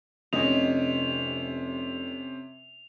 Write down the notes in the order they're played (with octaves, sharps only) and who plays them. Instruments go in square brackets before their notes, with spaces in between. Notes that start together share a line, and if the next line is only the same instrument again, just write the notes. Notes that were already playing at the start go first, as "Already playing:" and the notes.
[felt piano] F1 [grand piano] C3 C#4 [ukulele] D#5 [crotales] F7